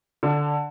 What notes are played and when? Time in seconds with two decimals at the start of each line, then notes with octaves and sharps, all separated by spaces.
0.23 D3